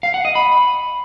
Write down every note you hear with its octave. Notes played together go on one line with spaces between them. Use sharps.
F5
F#5
D#5
B5